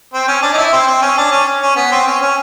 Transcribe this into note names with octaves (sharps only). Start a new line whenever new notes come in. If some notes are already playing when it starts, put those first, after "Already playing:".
C4
C#4
D4
D#4
E4
C4
C4
C#4
D4
C#4
C#4
B3
C4
C#4
C#4